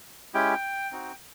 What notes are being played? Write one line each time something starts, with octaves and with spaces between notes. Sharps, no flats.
G#3 C#4 E4 G4 G5
C4 D#4 F#4